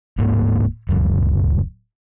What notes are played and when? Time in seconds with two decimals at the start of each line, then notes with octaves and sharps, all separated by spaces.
0.18 D1 G#2 A#3
0.89 D1 C#2 F#2